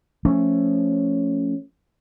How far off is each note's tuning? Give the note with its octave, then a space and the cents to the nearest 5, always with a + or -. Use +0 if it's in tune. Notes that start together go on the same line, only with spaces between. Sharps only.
F3 +0 A3 +15 C#4 +0